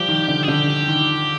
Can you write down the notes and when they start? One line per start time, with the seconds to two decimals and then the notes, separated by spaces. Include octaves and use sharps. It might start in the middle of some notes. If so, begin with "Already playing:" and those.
Already playing: F3 G3 G4
0.08 D#3
0.28 D3
0.43 G#4
0.48 D3 G4
0.88 D#3